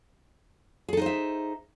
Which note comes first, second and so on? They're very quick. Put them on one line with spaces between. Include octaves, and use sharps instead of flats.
G#4 A4 D#4 C5 E5